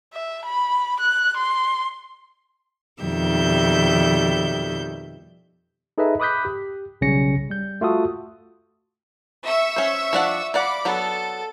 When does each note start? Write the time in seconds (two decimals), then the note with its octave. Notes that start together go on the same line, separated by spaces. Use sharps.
0.13 E5
0.45 B5
1.00 F#6
1.37 C6
3.03 F2 B2 D#3 G3 E5 G6
5.98 D#4 G#4 A4 B4 D#5 E5
6.20 B5 D6 D#6 F#6 G6 B6
6.45 G4
7.01 B1 C#3 G3 C#4 A#6 C#7
7.50 G3 G6
7.81 A3 F4 F#4 A4 D#6
9.46 E5 C#6 E6
9.76 C#4 C5
10.13 F3 D4 F#5
10.54 F4 D5 F#5 B5 D6
10.85 F#3 B3 D4 A4